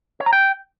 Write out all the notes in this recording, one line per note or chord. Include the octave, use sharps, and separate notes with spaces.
C#5
A#5
G5